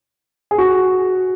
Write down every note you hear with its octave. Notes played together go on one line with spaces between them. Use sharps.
G#4
F#4